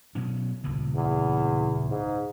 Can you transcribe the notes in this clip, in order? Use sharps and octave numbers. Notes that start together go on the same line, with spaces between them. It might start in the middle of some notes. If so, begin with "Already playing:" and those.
B2 F#3 C#4
D#1 C#2 A#2
E2
G#2